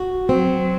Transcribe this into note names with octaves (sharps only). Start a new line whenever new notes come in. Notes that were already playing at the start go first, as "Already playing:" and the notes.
Already playing: F#4
F#3 C4